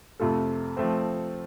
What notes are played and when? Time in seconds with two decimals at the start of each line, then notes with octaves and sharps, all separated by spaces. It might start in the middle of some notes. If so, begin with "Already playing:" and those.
0.20 F2 C3 A3 F4 A4
0.77 F3 A3 C4